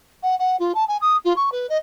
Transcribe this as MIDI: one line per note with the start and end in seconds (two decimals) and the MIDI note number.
0.23 0.35 78
0.39 0.56 78
0.59 0.72 65
0.75 0.84 81
0.88 0.97 80
1.01 1.17 87
1.25 1.33 65
1.36 1.50 85
1.52 1.67 71
1.69 1.77 75